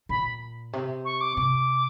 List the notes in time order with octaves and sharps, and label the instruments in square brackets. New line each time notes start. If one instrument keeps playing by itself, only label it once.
[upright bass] A#2 [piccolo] B5
[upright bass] C3
[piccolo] C#6
D6
[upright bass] C3 [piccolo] D6